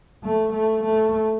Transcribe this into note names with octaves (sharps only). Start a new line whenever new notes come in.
A3
A3
A3